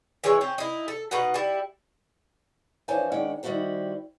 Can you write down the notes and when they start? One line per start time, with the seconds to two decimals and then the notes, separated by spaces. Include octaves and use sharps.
0.24 E3 G#3 E4 C#5
0.41 C4 C#4
0.58 D#4 E4
0.88 A4
1.11 B2 D#4 B4 F#5
1.34 G3 E4
2.88 F2 E3 D4 C5 C#5 G#5
3.12 D#3 G#3 C#4 D4 F#5 G5
3.43 D#3 G3 E4 F#4 G4 C5